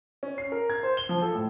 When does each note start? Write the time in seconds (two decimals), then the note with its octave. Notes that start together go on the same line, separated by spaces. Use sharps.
0.23 C#4
0.38 C7
0.52 A#4
0.70 G#6
0.83 C5
0.97 G7
1.09 F3
1.22 A4
1.35 A2